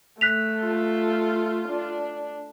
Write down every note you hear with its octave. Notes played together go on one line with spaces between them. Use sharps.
A3 F#6 B6 F7
F4
D4